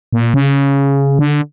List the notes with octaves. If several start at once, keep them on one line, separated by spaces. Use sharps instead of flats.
A#2
C#3
D3